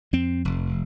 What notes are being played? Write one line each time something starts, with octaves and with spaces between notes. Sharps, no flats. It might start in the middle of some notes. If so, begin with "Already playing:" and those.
F2 C4
F1